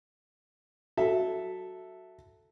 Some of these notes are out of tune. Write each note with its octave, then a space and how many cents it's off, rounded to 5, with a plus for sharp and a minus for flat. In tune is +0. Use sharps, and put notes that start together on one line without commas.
F#3 +0 A4 +0 E5 +0